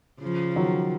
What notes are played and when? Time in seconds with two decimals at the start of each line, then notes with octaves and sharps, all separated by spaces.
0.22 C#3 F3
0.56 D#3 F#3